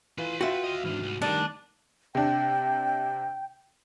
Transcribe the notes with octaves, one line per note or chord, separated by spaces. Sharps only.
E3 F4 B4 C6
F4 F#4 E5 G5
D#5 F5
G#2 E3 D4 F6
C2
D#3 G3 A3 D4 D#4
C3 D4 G5